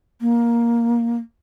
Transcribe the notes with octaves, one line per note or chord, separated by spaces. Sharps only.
A#3